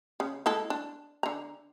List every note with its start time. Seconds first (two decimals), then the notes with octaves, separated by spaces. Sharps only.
0.20 C#3
0.46 G#3 E4 A4
0.70 D4
1.23 D3 A#5